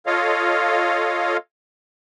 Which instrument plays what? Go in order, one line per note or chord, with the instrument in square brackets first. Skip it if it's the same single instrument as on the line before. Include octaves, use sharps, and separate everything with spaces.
[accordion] F4 A4 C#5 D#5 F5